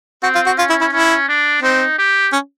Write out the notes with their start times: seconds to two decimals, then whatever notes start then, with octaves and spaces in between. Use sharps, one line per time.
0.23 C4 F#4
0.35 F4
0.46 F#4
0.58 C#4 F4
0.70 E4
0.81 E4
0.92 C#4 E4
1.29 D4
1.62 C4 D#4
1.98 G4
2.32 C#4